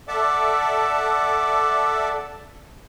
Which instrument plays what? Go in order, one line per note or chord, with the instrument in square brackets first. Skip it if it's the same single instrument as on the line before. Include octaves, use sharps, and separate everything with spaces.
[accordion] A4 D5 E5 [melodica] F#5 A5 D6